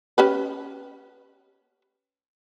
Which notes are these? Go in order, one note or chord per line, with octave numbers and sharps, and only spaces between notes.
C#4 G4 B4